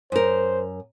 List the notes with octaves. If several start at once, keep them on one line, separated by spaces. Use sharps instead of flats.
F#2 A#4 C5